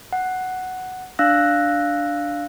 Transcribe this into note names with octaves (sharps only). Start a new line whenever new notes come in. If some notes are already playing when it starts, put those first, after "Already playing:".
F#5
D4 F5 E6 F#6 A#6